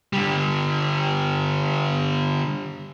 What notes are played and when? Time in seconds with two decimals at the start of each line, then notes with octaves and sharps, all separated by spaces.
0.13 D3 G3